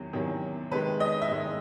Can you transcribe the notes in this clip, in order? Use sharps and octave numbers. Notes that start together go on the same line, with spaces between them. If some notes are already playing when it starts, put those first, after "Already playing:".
Already playing: E2 C3 D#3 F#3
E2 C3 D#3 F#3
C3 D#3 G#3 B4
D#5
E5
C3 D#3 G#3 D#5